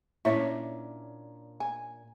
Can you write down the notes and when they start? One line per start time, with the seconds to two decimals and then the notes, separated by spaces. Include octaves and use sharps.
0.25 A#2 C#4 D4 E4 C#5 E5
1.60 G#5